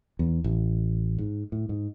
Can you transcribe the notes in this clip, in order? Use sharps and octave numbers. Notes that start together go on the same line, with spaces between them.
E2
A1
G#2
A2
G#2